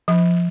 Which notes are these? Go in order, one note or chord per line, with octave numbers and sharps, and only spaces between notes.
F3